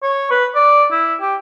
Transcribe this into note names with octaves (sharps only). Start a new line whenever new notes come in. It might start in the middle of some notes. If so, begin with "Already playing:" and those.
C#5
B4
D5
E4
G4